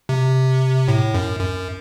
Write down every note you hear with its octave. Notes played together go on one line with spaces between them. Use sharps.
C3
A2
F#2
F#2